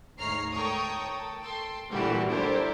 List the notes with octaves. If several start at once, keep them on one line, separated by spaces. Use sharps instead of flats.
D2 G#2 C#5 A#5 F6 C7
A4 C#5 G5 A#5 C#6 D#6
A4
A4 G5 C6
A#2 D3 E3 G3 F#4 G4
D4 E4 G4 A4 A#4 C5